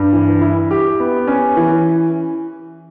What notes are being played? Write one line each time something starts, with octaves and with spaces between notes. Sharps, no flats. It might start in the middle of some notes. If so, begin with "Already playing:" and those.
Already playing: G2
E3
E4
G4
B3
C#4
E3